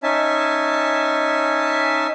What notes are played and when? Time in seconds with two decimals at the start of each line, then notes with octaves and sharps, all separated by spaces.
0.03 C#4 D#4 E5 G#5 A5